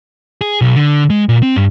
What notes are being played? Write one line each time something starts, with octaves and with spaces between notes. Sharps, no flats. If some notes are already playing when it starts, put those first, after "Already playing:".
G#4
B1
D3
G#3
A#2
C4
G2